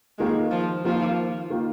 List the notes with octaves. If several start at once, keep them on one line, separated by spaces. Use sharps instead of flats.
D#3 G#3 A#3 F4
F3
D#3 F3 A#3 F4
D#3 A#3 F4